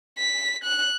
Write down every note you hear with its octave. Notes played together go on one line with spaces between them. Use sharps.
B6
F#6